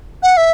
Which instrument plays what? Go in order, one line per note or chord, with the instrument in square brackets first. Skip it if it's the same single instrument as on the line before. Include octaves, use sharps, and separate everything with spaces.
[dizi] F#5
E5